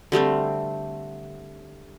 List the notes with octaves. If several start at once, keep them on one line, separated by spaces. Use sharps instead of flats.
D3 G3 A3 C4